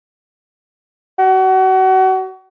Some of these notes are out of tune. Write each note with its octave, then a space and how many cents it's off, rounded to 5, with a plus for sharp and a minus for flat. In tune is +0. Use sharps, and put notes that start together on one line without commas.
F#4 +30